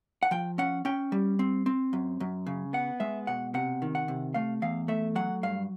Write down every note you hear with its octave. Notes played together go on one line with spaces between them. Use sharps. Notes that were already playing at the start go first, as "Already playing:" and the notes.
F#5
F3 G5
C#4 F#5
C#4 G5
G3
C4
C4
F#2
F#2
C#3
B3 F#5
G#3 E5
B2 F#5
C3 F#5
D#3
F#5
C3
A3 F5
E2 F5
A3 E5
F#3 F#5
G2 F5